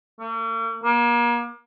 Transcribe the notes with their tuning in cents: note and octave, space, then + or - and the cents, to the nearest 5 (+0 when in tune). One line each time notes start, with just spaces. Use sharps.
A#3 -45
A#3 +35